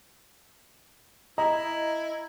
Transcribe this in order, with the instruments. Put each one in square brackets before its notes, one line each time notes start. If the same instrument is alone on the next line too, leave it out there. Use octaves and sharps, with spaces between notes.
[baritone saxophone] E4 [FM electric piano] D#5 [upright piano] A#5